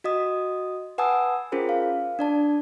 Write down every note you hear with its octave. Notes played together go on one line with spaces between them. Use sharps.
F#4 D#5 D#6
B4 F#5 G#5 A5 D#6 E6
C#4 F4 G#4 A#4 C5
F5
D4 D5 A5